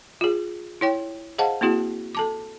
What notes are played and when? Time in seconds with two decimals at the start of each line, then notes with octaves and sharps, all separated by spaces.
0.21 F4 G#4
0.81 E4 C#5 G5
1.38 G#4 C5 D#5 F5 F#5 A5
1.61 A#3 C4 E4 F#4 G#4
2.15 A4 A5 D6